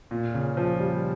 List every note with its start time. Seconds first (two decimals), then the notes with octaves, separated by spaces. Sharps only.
0.11 A#2
0.34 C#3
0.57 F3
0.80 G3